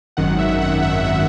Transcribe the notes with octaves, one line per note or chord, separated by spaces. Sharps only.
G#1 F#2 D#3 F#5
E5
F#5
E5
E5